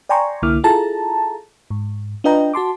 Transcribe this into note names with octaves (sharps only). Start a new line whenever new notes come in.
D5 G5 G#5 A#5 C6 C#6
C2 D3 A#3 E4 D6 F6
E4 F4 G#4 A4 A5 A#5
G#2
D4 F4 B4 D#5 G5 A#5
F#4 A5 C6 D6